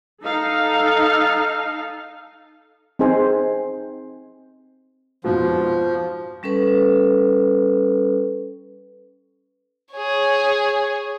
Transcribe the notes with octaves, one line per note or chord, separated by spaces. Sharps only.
D#4 A4 F5
C4 D#4 G#4 C5 G#5
F2 G#2 B2 F3
G3 C#4 A4 B4
G#4 C#5